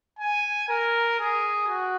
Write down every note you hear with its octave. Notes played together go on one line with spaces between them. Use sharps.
G#5
A#4
G#4
F#4